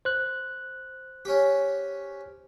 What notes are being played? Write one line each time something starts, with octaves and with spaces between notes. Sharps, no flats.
C5 F#6
C#4 G4